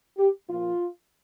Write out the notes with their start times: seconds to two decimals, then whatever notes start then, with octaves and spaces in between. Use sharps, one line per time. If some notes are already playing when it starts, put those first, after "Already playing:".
0.17 G4
0.49 A#2 F3 A#3 F4